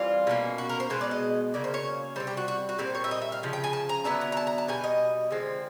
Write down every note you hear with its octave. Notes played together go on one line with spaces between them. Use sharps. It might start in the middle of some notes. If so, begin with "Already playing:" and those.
Already playing: E3 G3 C4 F4
B2 F#3 A#3 C#4
F#4
A#4
C5
B2 G#3 B3 C5
D5
D#5
C#3 F#3 A#3 D5
C5
C#5
C3 E3 G3 C5
G4
F#4
F#4
F#4
A#2 G3 C4 C5
C#5
E5
D#5
E5
F5
C#3 F3
G5
G#5
A5
A#5
D3 F#3 B3 E4 A5
A#5
A#5
A5
A#5
A5
B2 G3 G#5
D#5
D3 F3 G#3 C4